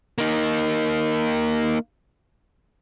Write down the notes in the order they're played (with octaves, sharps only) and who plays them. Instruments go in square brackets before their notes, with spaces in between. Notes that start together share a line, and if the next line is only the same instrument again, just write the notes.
[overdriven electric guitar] A#3 D#4